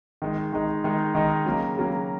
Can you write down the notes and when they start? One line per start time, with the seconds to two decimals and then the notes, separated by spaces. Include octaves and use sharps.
0.22 D#3 G#3 D#4
0.53 D#3 G#3 D#4
0.84 D#3 G#3 D#4
1.15 D#3 G#3 D#4
1.45 C#3 F#3 A#3
1.76 C#3 F#3 A#3